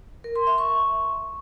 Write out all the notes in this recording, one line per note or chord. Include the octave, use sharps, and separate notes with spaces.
A#4
C6
E5
C#6